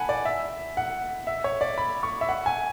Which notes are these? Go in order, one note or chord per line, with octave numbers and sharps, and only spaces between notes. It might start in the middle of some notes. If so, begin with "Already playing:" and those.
Already playing: F#5 G#5 A5 B5
D5
E5
F#5
E5
C#5
D5
B5
C#6
E5
F#5
G#5